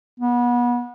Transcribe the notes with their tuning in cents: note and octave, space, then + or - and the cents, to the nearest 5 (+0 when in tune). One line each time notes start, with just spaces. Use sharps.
B3 -30